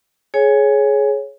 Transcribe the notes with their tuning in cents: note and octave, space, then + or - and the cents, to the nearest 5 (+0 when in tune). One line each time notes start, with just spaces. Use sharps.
G#4 +20 C#5 +0 G#5 -10